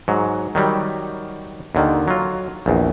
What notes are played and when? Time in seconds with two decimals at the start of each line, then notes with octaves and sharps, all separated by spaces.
0.08 G#2 F#3
0.55 D#3 F#3 G3
1.75 D#2 D3 D#3
2.08 F#3 F4
2.66 A#1 E2